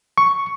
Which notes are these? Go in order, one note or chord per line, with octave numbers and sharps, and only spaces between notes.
C#6